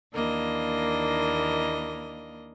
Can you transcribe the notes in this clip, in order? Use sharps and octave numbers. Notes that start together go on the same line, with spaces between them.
D#2 E3 A#3 D4 D#5